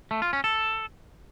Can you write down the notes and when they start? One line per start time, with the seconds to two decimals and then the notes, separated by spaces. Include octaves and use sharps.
0.11 A3
0.22 F4
0.33 C#4
0.44 A4